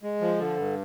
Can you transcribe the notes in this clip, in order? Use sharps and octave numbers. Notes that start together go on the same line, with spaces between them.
G#3
F3
D3
G2